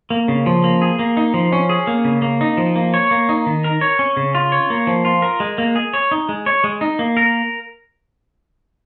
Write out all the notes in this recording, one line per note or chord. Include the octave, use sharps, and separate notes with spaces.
A#3
C#3
F3
A#3
G#4
A#3
D#4
F3
C#4
G#4
A#3
C#3
A#3
D#4
F3
A#3
C#5
A#3
D#4
D#3
A#4
C#5
C#4
C#3
F4
C#5
A#3
F3
F4
A#4
G#3
A#3
G#4
C#5
D#4
G#3
C#5
G#3
D#4
A#3
A#4